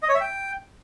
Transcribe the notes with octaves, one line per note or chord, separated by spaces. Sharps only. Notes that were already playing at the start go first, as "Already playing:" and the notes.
D#5
C#5
E5
G5